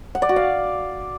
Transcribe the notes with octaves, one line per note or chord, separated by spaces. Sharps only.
F#5
D5
F#4
F5